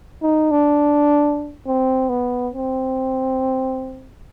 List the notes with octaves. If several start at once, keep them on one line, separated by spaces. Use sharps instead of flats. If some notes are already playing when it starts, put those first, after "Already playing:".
D#4
D4
C4
B3
C4